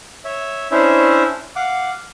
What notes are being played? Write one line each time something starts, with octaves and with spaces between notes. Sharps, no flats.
C#5 E5
C#4 D4 E4 C5 C#5 E5
F5 F#5 D6